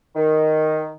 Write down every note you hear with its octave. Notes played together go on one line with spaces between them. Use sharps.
D#3